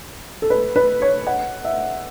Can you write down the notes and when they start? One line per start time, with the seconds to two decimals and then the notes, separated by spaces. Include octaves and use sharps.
0.42 A4
0.50 B4
0.76 B4
1.02 C#5
1.27 F#5
1.65 E5